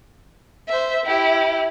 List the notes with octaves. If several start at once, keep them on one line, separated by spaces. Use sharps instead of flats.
C5 E5
E4 G4